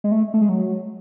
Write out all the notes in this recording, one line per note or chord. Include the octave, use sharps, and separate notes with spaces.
G#3
A3
A3
G#3
F#3